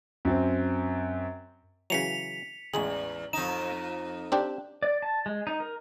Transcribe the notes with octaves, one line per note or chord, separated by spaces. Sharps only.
F#2 C4
C#3 E3 F#3 B6 C#7 F7
A1 E2 G#3 G#4 F#7
F2 D#4 E7
C4 D4 G4
D5
A5
G#3
D#4
A#4